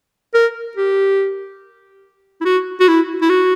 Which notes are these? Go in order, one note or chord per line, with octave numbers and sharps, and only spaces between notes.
A#4
G4
E4
F#4
F#4
E4
E4
F#4